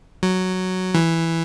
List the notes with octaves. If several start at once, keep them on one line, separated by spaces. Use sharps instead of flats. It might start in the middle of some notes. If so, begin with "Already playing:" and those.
F#3
E3